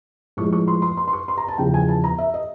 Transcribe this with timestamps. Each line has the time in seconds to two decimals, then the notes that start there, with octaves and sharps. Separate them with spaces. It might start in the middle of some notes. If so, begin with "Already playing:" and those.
0.37 A2 F3 G#3 C#6
0.53 C#6
0.68 C6
0.82 C6
0.97 C6
1.08 C6
1.13 C#6
1.28 C6
1.38 A#5
1.48 A5
1.58 E2 C#3 F3 G5
1.74 G#5
1.88 A5
2.04 A#5
2.18 E5
2.34 D#5